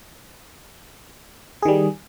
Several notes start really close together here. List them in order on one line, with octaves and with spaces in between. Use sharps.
G#4 D#3 G3